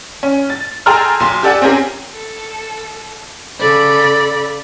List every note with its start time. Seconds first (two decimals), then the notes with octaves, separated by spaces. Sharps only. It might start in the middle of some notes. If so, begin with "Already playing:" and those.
0.23 C#4
0.50 A6
0.86 G#4 A4 G5 A#5 C6 F6
1.20 B1 C6
1.43 G4 A4 D5 F#5 G#5
1.62 C4 C#4 G4 G#4 A#4
2.14 A4
3.59 C#3 A4 D5 B5